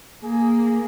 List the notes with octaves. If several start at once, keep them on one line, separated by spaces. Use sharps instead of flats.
A#3 G#4